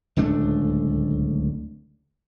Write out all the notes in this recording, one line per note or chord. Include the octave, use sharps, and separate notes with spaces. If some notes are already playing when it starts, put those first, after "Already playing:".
D1 C#2 A3 D4